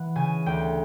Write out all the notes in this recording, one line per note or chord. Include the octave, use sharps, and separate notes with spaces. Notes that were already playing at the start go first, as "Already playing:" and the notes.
Already playing: E3 F#5
C#3 G#5
D2 G5